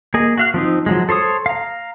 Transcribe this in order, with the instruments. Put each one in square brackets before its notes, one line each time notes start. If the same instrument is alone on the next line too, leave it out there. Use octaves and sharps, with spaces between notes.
[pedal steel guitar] A#3 G#4 D#5
F#4 F5 F#6
F3 C4 D#4
F3 F#3 G#3
A4 C5 C#5 D#6
F5 A#5